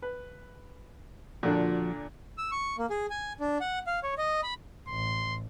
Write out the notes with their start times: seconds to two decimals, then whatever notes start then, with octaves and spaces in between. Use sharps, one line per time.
0.02 B4
1.43 A#2 D3 F3 D4 F#4
2.38 E6
2.51 C#6
2.78 A#3
2.90 G#4
3.10 G#5
3.40 D4
3.61 F#5
3.87 F5
4.03 C#5
4.18 D#5
4.43 B5
4.88 A1 C6